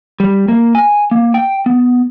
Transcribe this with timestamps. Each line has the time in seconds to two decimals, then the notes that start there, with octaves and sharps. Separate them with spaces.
0.20 G3
0.48 A#3
0.75 G#5
1.11 A#3
1.34 G5
1.66 B3